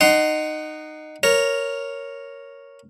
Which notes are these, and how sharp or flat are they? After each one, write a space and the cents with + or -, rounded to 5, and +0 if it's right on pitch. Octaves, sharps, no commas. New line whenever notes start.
D#4 -15 F#5 +15 C6 +0
A#4 +0 C#5 +0